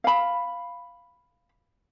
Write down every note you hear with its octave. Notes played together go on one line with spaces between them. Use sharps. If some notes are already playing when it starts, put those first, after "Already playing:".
F5 B5